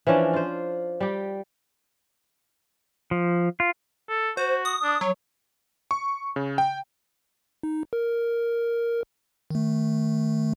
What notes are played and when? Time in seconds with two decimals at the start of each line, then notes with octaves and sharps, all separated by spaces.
0.07 E3 F3 C#4 D4
0.33 F4 C5
1.01 G3 G4
3.11 F3
3.60 F4
4.09 A4
4.37 F#4 C5
4.65 D#6
4.83 D4
5.01 F#3 C#5
5.91 C#6
6.36 C#3
6.58 G5
7.63 D#4
7.93 A#4
9.50 D#3 A3